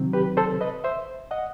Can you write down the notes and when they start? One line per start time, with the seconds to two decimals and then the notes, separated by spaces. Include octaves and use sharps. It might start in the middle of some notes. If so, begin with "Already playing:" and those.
Already playing: C3 D#3 F#3 C4
0.13 G4 B4
0.37 A4 C5
0.61 B4 D#5
0.84 C5 E5
1.31 D#5 F#5